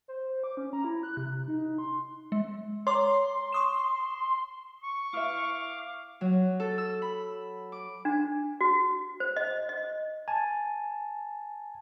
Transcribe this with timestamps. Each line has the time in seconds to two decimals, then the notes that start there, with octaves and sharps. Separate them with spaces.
0.08 C5
0.44 D6
0.57 C#4
0.73 A#5
0.84 E4
1.03 F#6
1.17 C3
1.48 D#4
1.78 C6
2.32 G#3
2.87 C#5 A#5 C6 D6
3.53 C#6 D#6 E7
4.83 C#6
5.13 E4 B4 E5 F5 D6
6.21 F#3
6.60 A4
6.78 E6
7.02 B5
7.72 D6
8.05 D4
8.61 F#4
9.20 C5
9.36 D#5
9.69 D#5
10.28 G#5 A5